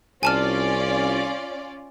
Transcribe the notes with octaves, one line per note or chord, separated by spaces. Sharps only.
C2 C#4 F4 D5 G#5 A5 F6